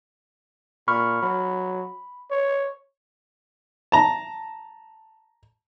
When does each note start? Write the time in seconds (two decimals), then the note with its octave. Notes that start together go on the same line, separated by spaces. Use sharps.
0.88 A#2 B5 C#6 F6
1.23 F#3 B5
2.31 C#5
3.92 A5 A#5